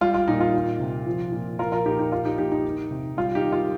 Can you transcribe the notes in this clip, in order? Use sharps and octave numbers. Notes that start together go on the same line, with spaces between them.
G3 F4
F4
A#2 D#4
F4
D#3
C3
F3
A#2
F3 F4 A#4
F4 A#4
A#2 D#4 G4
D#4 G4
F3 F4
D#4 G4
A#2 D#4 G4
D#4
D#3
C3
G3 F4
D#4 G4
D#3
F4